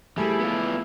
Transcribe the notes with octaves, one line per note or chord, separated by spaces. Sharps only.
E3 F3 G3 A3 E4 G#4
B3 F4